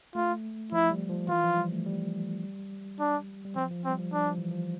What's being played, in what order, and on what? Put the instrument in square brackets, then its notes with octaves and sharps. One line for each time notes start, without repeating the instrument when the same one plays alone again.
[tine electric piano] A3 [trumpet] F4
[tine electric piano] F3 [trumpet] E4
[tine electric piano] G3
F3
[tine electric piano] E3 [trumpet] F4
[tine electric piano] F3
G3
A3
G3
[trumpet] D4
[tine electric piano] G3
[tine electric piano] F3 [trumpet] C4
[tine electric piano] F3
[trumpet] C4
[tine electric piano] G3
F3
[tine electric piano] G3 [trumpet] D4
[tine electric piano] F3
E3
F3